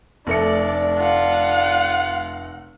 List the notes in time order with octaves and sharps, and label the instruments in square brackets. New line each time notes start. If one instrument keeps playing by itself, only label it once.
[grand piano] F1 A3 C#7 [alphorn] D4 [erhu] D5
[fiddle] F4 [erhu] F#5